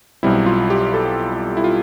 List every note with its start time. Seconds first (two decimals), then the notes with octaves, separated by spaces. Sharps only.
0.23 B1 B2 G3 C4 E4
0.46 F4
0.70 G4
0.94 A4
1.57 E4
1.64 F4